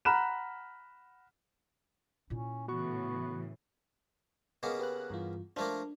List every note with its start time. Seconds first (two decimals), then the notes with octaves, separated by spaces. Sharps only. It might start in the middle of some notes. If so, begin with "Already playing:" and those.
0.05 F#5 A#5 B5 F6 F#6 E7
2.30 A#2 C#4 E4
2.68 A2 C#3 E3 B3 F#4 C#6
4.63 C#3 A#3 B3 D#5
4.79 G4 B4 F#6
5.10 G2 E3 F4
5.56 F3 A3 A#3 D4